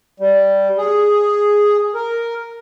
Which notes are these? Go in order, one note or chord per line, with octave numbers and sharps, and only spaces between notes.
G3
G#4
A#4